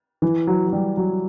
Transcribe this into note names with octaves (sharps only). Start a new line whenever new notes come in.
E3
F#3
F#3
G3
F#3